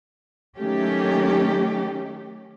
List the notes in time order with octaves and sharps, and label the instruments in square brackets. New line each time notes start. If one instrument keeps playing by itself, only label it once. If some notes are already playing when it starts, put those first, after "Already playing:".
[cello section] D#3 F#3 A3 C#4 G4